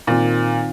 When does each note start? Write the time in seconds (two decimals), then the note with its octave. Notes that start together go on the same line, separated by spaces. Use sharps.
0.07 A#2 D#3 C4 F4